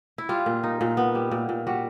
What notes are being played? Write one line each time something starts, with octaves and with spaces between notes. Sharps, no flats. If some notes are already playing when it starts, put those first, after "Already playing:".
E4
G3 F4
A#2
D#4
A#2
B3
G3
A#2
A#2
G3 F#4